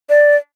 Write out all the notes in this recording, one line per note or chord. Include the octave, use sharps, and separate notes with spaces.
D5